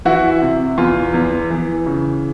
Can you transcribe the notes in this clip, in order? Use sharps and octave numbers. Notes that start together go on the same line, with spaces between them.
E3 E4 F#4
C3
E2 F4
E2
E3
C#3